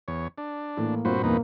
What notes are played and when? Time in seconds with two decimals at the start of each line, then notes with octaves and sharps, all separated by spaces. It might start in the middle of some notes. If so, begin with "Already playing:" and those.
0.08 E2 C#5
0.38 D4
0.77 A2 E3 A#3
1.05 G1 A#2 C4 F#4 B4 C5
1.24 E2 A#3 D#4 B4